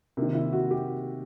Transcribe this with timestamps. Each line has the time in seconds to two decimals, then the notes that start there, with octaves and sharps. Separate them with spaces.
0.17 C3 D#3 A#3
0.35 E4
0.53 F#4
0.71 G4